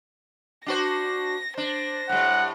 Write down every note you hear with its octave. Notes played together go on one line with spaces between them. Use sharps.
D4 F#4 C5 A#6
D4 C5 A#6
A2 G3 F#5